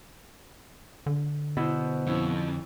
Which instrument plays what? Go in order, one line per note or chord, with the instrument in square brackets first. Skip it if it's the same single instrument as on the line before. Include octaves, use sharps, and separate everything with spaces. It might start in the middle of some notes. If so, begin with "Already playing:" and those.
[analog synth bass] D3
[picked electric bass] B2 [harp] E4 C5
[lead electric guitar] F2 [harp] C#4 E4